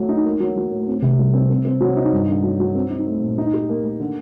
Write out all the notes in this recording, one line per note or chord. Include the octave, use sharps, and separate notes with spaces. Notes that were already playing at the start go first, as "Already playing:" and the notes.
Already playing: F#3 A3
D#4
A#3
F#3
F#3
A2
C4
C3
G3
C4
C4
C4
F#3
D#4
G2
D3
F#3
F#3
C4
D#4
A3
A#2
D#4
G4
A#3
A#3
D3